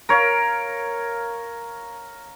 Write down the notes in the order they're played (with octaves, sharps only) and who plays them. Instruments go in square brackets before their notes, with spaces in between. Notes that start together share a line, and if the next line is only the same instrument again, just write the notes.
[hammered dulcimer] A#4 C#5 F5